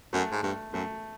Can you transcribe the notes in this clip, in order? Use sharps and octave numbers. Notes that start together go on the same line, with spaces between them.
F#2 A3
G#2
G2 A3
F#2 A3